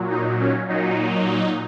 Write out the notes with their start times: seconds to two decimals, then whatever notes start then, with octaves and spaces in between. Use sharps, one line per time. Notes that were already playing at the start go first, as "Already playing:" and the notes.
Already playing: A#2 F#3
0.10 D#4
0.40 C#4
0.69 A#2 F#3 D#4